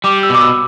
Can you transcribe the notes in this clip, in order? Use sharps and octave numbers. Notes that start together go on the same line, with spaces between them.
G3 D6
E6
B2
D6
E6